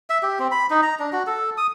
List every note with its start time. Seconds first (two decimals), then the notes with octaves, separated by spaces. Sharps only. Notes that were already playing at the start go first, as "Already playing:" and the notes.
0.10 E5
0.23 G4
0.39 C4
0.51 B5
0.70 D#4
0.83 A#5
0.99 D4
1.13 F#4
1.27 A4
1.58 D#6